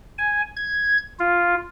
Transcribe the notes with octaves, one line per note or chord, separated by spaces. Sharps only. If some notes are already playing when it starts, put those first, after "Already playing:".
G#5
G#6
F4